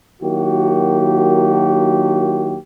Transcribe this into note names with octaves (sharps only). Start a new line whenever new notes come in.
D#3 F#3 A#3 E4 F#4 G4